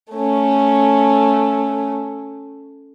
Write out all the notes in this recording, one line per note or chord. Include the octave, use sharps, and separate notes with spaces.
A3 C#4